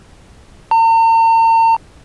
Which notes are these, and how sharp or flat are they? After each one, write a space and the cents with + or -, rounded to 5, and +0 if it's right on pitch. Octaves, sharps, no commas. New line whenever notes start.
A#5 -45